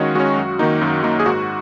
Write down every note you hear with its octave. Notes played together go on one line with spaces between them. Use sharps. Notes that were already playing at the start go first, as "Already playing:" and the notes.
Already playing: D#3 G#3 C#4 F#4 C#5 D#5 F5
G#3 C#4 F#4
F#2
D#3 A#3 D#4
F#2
D#3 A#3 D#4
G#4
G#2 F#4